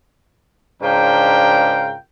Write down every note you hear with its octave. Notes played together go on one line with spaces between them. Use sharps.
G#2 C#3 D4 F4 A#4 G5